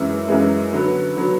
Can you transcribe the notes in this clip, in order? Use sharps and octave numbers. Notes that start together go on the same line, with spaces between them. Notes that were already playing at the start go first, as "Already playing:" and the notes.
Already playing: F#2 E3 G#3
F#2 E3 G#3
D3 F#3 B3
D3 F#3 B3